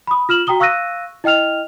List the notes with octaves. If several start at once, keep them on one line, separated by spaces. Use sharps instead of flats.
B5 D#6
F4 F6 E7 F#7
F#4 G5 A#5 D#6 G7
F5 C#6 E6 F#6 A#6 D#7
E4 D#5 G5 F6 F7